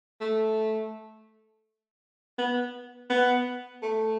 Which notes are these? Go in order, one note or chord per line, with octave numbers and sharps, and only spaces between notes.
A3
B3
B3
A3